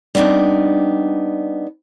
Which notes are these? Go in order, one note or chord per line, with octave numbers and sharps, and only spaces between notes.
G3 B3 C4 D4 D#4